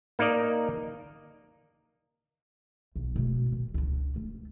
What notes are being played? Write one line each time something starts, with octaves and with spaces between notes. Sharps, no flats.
A#3 D#4 A#4 D5 D#5
B1 A#2
B2 A3
A#2
C#2 D4
A3